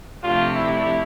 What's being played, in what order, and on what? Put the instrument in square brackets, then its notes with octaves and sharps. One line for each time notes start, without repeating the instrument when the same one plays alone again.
[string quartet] C3 F3 A3 D4 G4 [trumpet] F4
[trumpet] E4